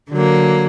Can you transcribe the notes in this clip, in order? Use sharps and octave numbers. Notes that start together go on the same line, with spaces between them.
D3 F#3 A#3